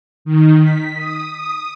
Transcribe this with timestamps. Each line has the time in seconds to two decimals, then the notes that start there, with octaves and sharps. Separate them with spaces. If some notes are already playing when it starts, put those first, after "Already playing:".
0.25 D#3
0.61 B6
0.96 D#6
1.31 D#6